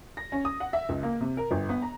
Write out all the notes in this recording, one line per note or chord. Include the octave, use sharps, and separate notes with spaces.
A#6
C#4
D#6
F#5
E5
C#2
A#3
C3
A#4
G1
B3
A#5